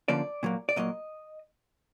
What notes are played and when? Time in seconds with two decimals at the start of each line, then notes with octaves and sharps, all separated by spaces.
0.08 D3 F3 A#3 C#4 D5
0.43 A#2 F#3 A#3
0.69 D5
0.76 A#2 F#3 A#3 D#5